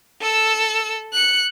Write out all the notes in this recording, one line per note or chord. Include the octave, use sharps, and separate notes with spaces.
A4 E6
F#6 C#7